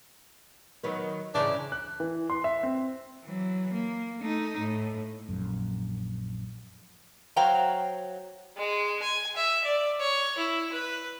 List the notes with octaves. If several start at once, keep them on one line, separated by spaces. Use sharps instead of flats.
D#3 F#3 B3
G#2 C#3 E3 D4
F#6
E3
C6
E5
C4
E3 F#3
A#3
A3 D#4
A2
A#1 F#2
F#3 C5 F5 G5 A#5
G#3
G#5
E5
D5
C#5
E4
B4